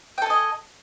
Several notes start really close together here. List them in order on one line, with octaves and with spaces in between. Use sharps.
G5 A4 G#5 D#5